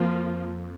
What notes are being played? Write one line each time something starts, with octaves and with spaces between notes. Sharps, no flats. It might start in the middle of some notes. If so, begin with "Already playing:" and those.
Already playing: F2 F3 A#3 F4